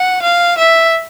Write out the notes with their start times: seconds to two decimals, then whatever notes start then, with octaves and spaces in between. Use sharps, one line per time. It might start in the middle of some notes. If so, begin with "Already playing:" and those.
Already playing: F#5
0.22 F5
0.58 E5